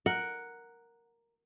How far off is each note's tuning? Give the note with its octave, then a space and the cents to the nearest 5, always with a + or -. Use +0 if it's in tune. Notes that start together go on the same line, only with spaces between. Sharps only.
A#4 +0 F#5 +0